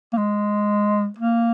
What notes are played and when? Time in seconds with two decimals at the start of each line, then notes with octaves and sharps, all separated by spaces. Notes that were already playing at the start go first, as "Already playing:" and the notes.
0.13 A#3
0.18 G#3
1.19 A#3